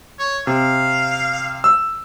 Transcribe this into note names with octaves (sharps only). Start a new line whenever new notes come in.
C#5
C3 F5
E6